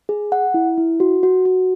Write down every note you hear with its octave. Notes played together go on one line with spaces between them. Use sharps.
G#4
F#5
E4
E4
F#4
F#4
F#4